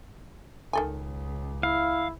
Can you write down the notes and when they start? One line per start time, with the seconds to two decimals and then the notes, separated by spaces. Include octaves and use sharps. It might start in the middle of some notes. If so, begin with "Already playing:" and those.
0.73 C#2 D#3 A4 G#5
1.63 E4 F5